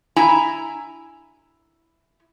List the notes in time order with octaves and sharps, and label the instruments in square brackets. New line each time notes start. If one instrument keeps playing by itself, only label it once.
[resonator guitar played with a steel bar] E4 G#5 A#5